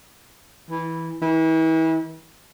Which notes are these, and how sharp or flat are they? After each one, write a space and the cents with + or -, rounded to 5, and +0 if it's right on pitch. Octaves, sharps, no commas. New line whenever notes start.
E3 -10
E3 -35